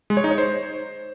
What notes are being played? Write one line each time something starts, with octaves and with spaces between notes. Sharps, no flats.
G#3
C#5
D#4
C#5
C5